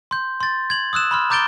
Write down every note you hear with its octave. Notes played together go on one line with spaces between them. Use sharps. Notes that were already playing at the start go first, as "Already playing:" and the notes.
C6 G6
C6 A6
G#6 F#7
D#6 E6 F#6 E7
B5 C6 F6
A#5 D6 G6 A6 D7 G7